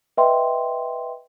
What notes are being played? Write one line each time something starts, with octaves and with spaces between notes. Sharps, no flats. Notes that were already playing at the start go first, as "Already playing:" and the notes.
B4 D#5 E5 G5 C6